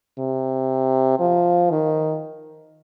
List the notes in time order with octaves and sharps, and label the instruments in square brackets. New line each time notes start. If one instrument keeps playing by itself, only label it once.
[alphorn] C3
F3
D#3